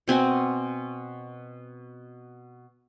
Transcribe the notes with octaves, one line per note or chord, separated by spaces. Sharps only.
B2 C4 F#4 G#5